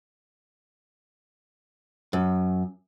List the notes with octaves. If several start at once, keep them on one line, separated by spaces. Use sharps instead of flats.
F#2